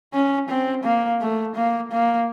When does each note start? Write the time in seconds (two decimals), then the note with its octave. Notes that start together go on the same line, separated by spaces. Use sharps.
0.13 C#4
0.49 C4
0.84 A#3
1.21 A3
1.55 A#3
1.92 A#3